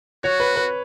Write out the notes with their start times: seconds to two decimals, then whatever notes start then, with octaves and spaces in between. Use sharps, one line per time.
0.23 F#4 C#5
0.40 B4
0.56 B4